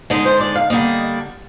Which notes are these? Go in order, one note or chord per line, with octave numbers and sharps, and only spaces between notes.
D3 G#3 D#4 D#5
C5
D5
F5
D3 G3 A#3 D#5